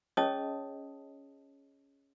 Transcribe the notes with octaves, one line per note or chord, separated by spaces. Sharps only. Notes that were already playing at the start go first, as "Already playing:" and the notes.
C#4 G#4 C#5 D#5 A5 D#6